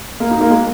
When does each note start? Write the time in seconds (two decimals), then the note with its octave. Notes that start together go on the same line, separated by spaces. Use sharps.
0.20 A#3
0.31 D#4
0.41 A#3
0.50 G#3